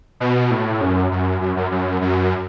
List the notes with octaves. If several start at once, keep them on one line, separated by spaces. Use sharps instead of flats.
B2
A2
F#2
F#2
F#2
F#2
F#2
F#2